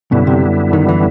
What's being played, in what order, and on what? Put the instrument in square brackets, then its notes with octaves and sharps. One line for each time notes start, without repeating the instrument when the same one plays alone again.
[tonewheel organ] F#2 D3 G3 B3 E4 [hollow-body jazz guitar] B2
[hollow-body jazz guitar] C3
D#3
E3